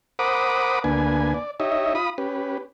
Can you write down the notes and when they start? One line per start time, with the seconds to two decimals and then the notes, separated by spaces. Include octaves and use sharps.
0.19 A#4 C5 F#5 B5 D6 D#6
0.84 D2 A#3 D4 B4 G#5
1.34 D5
1.60 D#4 G4 C#5 D#5 E5
1.95 F4 B5 D#6
2.18 C#4 G4 B4